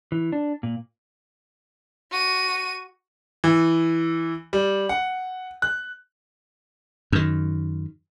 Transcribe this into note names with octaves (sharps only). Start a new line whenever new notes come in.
E3
D4
A#2
F#4 D#7
E3
G3
F#5
F#6
F#2 D#3